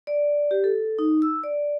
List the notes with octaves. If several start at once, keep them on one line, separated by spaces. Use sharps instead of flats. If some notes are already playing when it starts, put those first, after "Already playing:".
D5
G4
A4
D#4
E6
D5